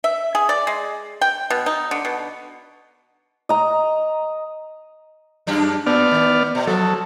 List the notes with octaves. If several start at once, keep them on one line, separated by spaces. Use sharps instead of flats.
E5
G#4
D5
G#3
G5
B2
D#4
D3
B2
D#5 A#5
F#2 D4 G4
A2 B3 D5 F6
D#3
B2
F3 F#3 A4